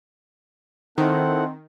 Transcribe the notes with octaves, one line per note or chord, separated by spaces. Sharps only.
D#3 C4 E4 A4 C5 F#5